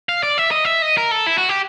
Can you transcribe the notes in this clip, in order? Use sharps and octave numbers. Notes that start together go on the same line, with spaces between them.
F5
D5
E5
D#5
E5
D#5
A#4
A4
E4
F#4
G4